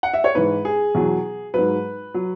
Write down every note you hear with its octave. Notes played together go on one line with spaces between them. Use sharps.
F#5
E5
C#5
G#2 E3 B4
G#4
E2 B2 F#3
G#2 F#3 B4
F#3